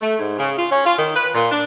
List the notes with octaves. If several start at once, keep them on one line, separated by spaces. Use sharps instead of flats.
A3
G#2
C#3
F4
C#4
F4
D#3
B4
A#2
D4